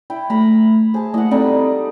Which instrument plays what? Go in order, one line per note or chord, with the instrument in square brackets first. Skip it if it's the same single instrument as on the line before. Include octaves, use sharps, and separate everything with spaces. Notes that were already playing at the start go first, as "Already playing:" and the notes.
[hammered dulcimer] E4 [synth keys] G5
[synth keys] A3 [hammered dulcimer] A#5 B5
[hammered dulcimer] G#4 A5 [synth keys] C5
[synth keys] A3 A#3 E4 [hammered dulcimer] D#5 F#5
[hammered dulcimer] G3 D#4 A4 [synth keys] C4 E4